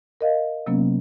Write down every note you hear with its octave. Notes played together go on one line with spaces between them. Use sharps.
A#4 D#5 F5
C3 F#3 A#3 B3 C#4